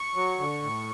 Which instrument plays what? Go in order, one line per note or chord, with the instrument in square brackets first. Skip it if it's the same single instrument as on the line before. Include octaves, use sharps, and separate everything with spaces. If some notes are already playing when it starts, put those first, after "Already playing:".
Already playing: [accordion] C#6
F#3
D3
A2